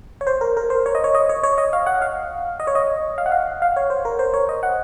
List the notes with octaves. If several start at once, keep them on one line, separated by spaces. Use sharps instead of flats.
C#5
C5
A#4
A#4
C5
C#5
D#5
C#5
D#5
C#5
C#5
D#5
F5
F#5
F5
D#5
C#5
D#5
F5
F#5
F5
F5
C#5
C5
A#4
C5
C#5
D#5
F#5